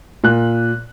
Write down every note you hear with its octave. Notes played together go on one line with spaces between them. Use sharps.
A#2 F#6